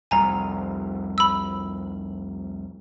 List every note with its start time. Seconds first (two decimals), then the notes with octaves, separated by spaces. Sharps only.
0.11 F1 C2 G#5 A#5
1.18 B5 E6